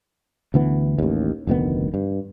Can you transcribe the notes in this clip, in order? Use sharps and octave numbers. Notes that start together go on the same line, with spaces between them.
D2 D3 E3 B3
A1 D#2
F1 D2 D#3 B3
G2